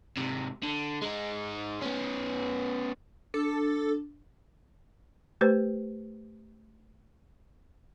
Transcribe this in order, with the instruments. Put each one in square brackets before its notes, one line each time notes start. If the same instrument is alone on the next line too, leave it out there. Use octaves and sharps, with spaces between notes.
[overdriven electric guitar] G#2 C3
D3
G#3 D#4
B3 C#4
[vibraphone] D4 [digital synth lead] A4
[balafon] A3 G4 B4 C5